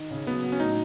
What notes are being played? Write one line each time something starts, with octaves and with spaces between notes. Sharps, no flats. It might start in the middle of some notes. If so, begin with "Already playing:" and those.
Already playing: D#3 D#4
C#3
F#3 B3
F#3
C#4
A2 D#4